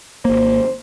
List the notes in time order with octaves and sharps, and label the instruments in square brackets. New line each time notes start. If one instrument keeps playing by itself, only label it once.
[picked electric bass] G#1 A#3 [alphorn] C5